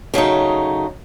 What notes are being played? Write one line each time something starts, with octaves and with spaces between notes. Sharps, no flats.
C#3 F#3 A3 D#4